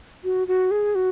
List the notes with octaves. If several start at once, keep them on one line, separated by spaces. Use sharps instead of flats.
F#4
F#4
G#4
F#4